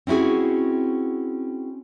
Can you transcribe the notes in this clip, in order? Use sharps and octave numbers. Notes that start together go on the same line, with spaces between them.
C4 C#4 E4 F#4 G#4